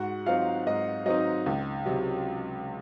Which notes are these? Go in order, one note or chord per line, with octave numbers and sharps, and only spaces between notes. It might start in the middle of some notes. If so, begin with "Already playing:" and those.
Already playing: G#2 F#4 F#5
F#3 C4 D#4 F4 F5
G#2 D#5
F#3 C4 D#4 D#5
C#2
C3 F#3